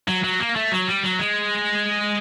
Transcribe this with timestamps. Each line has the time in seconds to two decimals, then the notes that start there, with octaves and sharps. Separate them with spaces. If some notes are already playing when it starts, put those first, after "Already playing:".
0.08 F#3
0.24 F#3
0.40 A#3
0.56 A3
0.72 F#3
0.87 G3
1.03 F#3
1.19 G#3